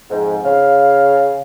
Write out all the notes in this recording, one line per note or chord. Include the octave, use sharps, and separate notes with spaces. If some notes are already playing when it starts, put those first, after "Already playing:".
F2 G#2
C#3 F5